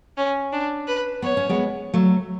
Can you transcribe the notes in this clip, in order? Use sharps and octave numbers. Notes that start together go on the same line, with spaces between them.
C#4
D4
B4
B3 C#5
C#4
G#3 B3
F#3 A3